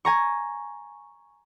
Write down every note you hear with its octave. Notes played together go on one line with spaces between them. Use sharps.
G#5 A#5 C#6